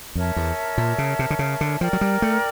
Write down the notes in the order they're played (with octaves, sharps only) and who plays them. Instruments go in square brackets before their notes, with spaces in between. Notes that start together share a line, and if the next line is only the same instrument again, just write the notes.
[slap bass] F2 [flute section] A#4 C#5 E5 A5
[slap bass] E2
A#2
C#3
C3
D3
C#3
D3
[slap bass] F3 [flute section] A#4 D5 G5
[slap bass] F#3
G3
A3